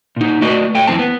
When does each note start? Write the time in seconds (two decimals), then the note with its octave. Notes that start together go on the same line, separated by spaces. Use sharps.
0.16 A#2 D#4
0.42 A3 F#4 B4 D5 D#5
0.75 A3 G5
0.87 F2 G#2 E3 C4 A5
0.99 B3